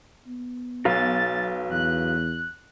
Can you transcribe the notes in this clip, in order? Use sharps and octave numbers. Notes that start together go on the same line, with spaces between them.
B3
B1 F#4 B4 F5 A6
E2 F#6